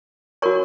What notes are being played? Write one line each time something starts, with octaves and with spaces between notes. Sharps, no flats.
F#4 A#4 C#5 C#6